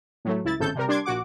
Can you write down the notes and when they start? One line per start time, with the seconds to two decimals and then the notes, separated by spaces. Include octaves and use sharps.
0.25 A2 F#3 A3
0.44 C#2 E4 A6
0.59 G#1 A2 C#3 A4 G6
0.75 C3 G3 A#4
0.88 G3 D4 C6 D6 G#6
1.06 A#1 F#4 F#5 D6